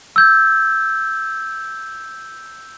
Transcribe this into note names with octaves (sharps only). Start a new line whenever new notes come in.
E6 G6 G#6